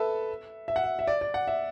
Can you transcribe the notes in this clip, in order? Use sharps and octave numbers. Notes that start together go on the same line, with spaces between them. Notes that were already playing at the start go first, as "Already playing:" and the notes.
Already playing: A4 B4 E5
E5
F#5
E5
E5
D5
D5
F#5
E5